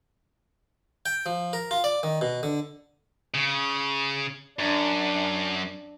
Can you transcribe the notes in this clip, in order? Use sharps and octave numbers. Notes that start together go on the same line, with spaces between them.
G5
F3
A#4
F4
D5
D#3
B2
D3
C#3
F#2 D4